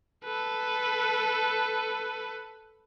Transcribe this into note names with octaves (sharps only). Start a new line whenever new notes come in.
A4 B4